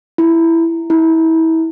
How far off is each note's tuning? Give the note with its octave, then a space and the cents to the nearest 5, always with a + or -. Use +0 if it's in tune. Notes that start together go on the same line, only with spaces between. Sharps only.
E4 +5
E4 -30